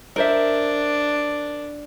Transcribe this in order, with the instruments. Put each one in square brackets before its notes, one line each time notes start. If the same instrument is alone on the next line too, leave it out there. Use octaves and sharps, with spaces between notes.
[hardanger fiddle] D4 [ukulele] A#4 C5 E5